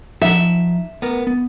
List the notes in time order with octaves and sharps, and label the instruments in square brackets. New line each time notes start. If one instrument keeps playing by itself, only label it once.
[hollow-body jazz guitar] F3 D#4 F#5 [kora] E5
[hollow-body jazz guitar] B3 A#4
B3